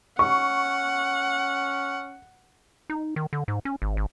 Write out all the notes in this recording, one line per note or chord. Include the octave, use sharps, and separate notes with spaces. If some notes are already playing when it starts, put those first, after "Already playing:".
C#4 F#5 C#6
D#4
D#3
D3
G#2
C#4
G#1
G#1